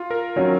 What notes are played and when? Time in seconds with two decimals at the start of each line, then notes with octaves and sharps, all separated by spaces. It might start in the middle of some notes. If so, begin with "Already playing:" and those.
Already playing: F4
0.11 A#4
0.36 D#3 F#3 C#4